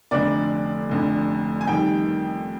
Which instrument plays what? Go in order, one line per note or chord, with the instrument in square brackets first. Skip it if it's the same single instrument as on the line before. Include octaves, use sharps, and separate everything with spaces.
[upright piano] F1 F2 D3 D5
F1 F2 D3
G#5
F2 D#3 G3 G5